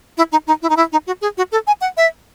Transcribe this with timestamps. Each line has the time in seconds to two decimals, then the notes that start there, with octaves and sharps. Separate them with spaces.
0.18 E4
0.32 D#4
0.47 D#4
0.62 E4
0.70 D#4
0.77 E4
0.92 D#4
1.07 F#4
1.21 G#4
1.37 F#4
1.52 A4
1.67 G#5
1.81 F#5
1.97 E5